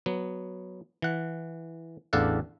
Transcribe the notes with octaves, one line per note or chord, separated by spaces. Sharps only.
F#3 B3
E3 F#5
A1 E2 D4 A4 F5 F#5